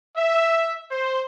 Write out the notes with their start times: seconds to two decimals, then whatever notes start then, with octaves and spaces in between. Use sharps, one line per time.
0.17 E5
0.91 C5